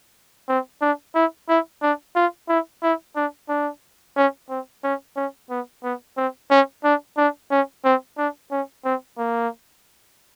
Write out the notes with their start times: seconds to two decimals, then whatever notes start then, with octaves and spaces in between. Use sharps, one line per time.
0.49 C4
0.82 D4
1.15 E4
1.49 E4
1.82 D4
2.16 F4
2.49 E4
2.83 E4
3.16 D4
3.49 D4
4.17 C#4
4.50 C4
4.84 C#4
5.16 C#4
5.50 B3
5.84 B3
6.17 C4
6.51 C#4
6.84 D4
7.18 D4
7.51 C#4
7.85 C4
8.18 D4
8.51 C#4
8.85 C4
9.18 A#3